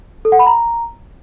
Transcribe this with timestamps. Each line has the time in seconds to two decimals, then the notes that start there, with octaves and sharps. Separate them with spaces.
0.25 A4
0.32 F#5
0.39 B5
0.47 A#5